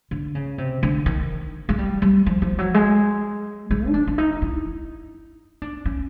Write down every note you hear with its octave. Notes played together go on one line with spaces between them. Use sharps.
D3
C#3
C3
D3
D#3
G#3
G3
G3
F3
F3
F#3
G#3
G#3
D#4
D4
D4
D#4
E4
D4
C#4